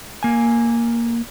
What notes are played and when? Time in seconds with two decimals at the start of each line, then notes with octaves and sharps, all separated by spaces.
0.23 A#3 G#5